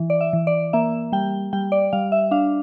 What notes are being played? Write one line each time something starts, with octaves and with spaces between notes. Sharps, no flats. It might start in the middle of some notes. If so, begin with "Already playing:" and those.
Already playing: E3
D5
E5
E3
D5
A#3 E5
G3 G5
G3 G5
D5
G3 F5
E5
D4 F5